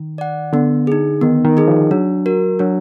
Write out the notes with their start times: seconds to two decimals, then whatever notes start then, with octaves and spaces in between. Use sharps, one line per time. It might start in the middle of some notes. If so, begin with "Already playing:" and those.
Already playing: D#3
0.18 D5 F#5
0.53 D3 B3
0.87 D#4 G#4
1.21 D#3 B3
1.44 D#3
1.57 D#4 G#4
1.68 F3
1.91 F#3 D4
2.26 F#4 A#4
2.59 F#3 D4